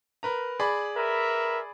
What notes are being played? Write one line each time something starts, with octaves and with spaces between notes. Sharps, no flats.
A#4 B4 A#5
G#4 D5 B5
A#4 B4 E5